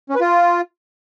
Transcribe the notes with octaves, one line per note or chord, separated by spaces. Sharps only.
C#4
B4
F4